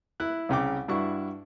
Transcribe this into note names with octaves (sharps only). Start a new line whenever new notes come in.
E4 F#6
C2 C#3 G5 D6
G2 D4 E4 F#4 C#6